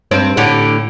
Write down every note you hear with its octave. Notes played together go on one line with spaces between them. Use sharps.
G2 C4 C5
A2 D3 G4